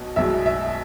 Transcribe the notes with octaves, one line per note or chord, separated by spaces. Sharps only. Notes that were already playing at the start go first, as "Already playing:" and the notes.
Already playing: B1 B2
B1 B2 G#3 E5
E5